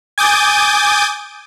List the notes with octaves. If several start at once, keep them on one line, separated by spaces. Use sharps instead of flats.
G#5 D6 D#6 G6 A6